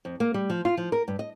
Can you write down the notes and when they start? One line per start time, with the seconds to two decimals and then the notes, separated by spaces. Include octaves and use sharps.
0.05 F2
0.20 A#3
0.34 G3
0.50 F3
0.65 F4
0.77 F3
0.92 A#4
1.08 G2
1.19 D#5